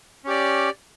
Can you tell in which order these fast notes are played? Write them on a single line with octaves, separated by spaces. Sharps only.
C#4 G4 D5